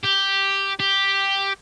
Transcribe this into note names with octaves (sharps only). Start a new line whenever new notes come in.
G4
G4